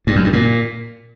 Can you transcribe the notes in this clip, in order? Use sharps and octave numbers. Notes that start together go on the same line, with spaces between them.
G2
F#2
G2
A#2